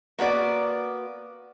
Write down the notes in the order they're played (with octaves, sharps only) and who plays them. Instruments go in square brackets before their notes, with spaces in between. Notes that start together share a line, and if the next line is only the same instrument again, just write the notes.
[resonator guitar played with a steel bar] A#3 B3 F#4 D5